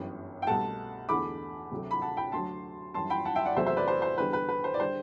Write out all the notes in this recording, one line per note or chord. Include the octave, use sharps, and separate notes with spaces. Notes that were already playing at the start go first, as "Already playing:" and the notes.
Already playing: G1 F#2 E3 G3
G5
C2 B2 A3 F#5 A5
E2 D3 A3 B5 D6
D2 C3 F#3 A3
B5
F#5 A5
G5 B5
D2 D3 F#3 A5 C6
F#2 E3 G3 A5 C6
G5 B5
F#5 A5
E5 G5
D5 F#5
E2 C3 F#3 A3 C5 E5
C5 E5
B4 D5
C5
C5
E2 D3 G3 B4
B4
B4
C5
D5
D3 G3 C5